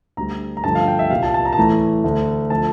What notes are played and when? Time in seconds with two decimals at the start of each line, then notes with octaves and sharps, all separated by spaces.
0.17 D2 D3 G3 A#5
0.57 A#5
0.64 G2 D3 F3 A3 A5
0.75 F5
0.88 G5
0.99 E5
1.10 C2 A#2 G3 F5
1.23 A5
1.34 A5
1.45 A#5
1.53 A5
1.58 A2 E3 A3 A#5
2.04 D2 D3 A3
2.50 D3 F3 A3 A5